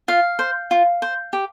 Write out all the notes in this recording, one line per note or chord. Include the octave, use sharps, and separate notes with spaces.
F4 F5
C5
F4
C5
G4